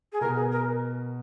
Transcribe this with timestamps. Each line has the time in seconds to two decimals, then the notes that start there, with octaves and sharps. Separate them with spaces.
0.13 G#4
0.21 B2 A#4
0.37 G#4
0.52 A#4